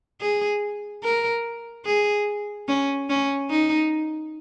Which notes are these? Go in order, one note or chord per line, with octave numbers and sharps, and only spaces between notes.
G#4
A#4
G#4
C#4
C#4
D#4